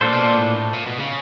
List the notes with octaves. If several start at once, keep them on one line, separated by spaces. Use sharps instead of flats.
A#2 A#3 D4 F4 A4 C5
B2
A#2
A2
A#2
B2
C#3